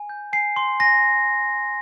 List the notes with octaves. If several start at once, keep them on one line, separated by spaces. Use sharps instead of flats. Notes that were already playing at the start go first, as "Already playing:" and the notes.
Already playing: G#5
G6
G#5 C7
C6
G#5 A#6